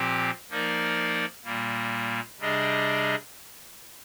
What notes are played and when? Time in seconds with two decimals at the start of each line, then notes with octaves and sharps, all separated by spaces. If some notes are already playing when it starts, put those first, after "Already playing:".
Already playing: A#2 F3 C4 G4
0.50 F3 A#3 D#4 A#4 D5
1.44 A#2 G3 A#3
2.39 C3 G3 D4 G#4 D#5